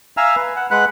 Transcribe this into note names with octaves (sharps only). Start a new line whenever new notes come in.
E5 F5 G#5 A#5 E6 F6
B4
F#5
G#3 B4 F#5 B5 F#6